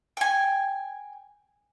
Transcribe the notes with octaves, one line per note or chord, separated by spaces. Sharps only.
G5 G#5